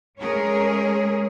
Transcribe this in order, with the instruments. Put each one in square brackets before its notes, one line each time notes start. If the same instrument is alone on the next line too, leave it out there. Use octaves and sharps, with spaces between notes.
[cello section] G#3 A3 C#4 G#4 A#4 C#5